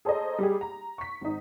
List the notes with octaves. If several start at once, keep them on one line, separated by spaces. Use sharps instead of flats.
G#4 A4 C5 C#5 D#5 A#5
G3 G4 G#4
A#5
C#6 B6
G#1 D#4